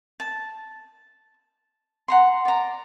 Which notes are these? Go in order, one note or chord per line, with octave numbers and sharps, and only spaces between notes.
A5
F#5 A#5 C6
D5 A#5